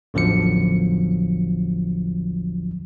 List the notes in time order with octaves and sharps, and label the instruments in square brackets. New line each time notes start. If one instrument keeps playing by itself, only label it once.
[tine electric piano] A1 E2 D3 F3 F#3 C#7